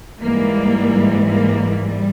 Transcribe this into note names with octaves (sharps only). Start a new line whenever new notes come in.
G#2 E3 G3 A#3
A#3
G3